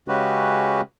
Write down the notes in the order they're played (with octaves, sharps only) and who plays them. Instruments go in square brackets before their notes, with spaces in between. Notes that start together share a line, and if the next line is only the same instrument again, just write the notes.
[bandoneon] C#3 G#3 C#4 F#4 G4 B4